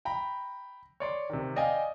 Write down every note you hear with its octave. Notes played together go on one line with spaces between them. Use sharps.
G5 A#5 B5
C#5 D5 C6
C3 D#3
D5 D#5 F5 G5 G#5